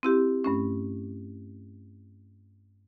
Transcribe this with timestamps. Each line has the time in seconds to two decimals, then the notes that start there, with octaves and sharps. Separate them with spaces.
0.03 C4 E4 G4
0.44 G2 A3 C#4